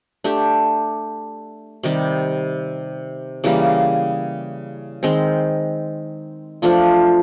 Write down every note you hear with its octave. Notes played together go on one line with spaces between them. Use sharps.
A3 D4 G4
C3 D#3 G3
C#3 E3 G3 A#3
D#3 G#3 C4
F3 A3 D4 F4